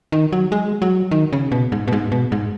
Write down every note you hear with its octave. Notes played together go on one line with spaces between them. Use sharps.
D#3
F#3
G#3
F#3
D#3
C#3
B2
G#2
B2
G#2
B2
G#2